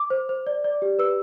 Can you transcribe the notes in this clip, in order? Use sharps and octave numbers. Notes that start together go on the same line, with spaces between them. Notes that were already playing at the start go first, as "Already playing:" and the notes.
Already playing: D6
C5
C5
D5
D5
G4
B4 E6